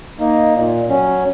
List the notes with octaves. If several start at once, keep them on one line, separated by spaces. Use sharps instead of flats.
A#3 D#4
A#2
F#3 C#4